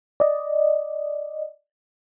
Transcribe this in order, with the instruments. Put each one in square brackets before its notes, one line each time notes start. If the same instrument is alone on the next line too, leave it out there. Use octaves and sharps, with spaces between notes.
[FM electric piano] D5 D#5